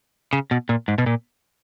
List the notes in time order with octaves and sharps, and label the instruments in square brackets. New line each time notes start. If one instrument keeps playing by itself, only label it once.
[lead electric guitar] C#3
B2
A#2
G#2
B2
A#2